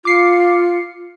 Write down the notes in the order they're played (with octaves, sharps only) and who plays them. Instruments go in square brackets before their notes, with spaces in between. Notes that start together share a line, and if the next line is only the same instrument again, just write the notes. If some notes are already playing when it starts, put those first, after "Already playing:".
[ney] F4 [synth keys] D6 C7 C#7